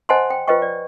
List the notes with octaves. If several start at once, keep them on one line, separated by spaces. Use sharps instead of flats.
C5 D#5 F#5 G#5 A5 C6
G5
F4 B4 C5 D#5 G5 C#6
D5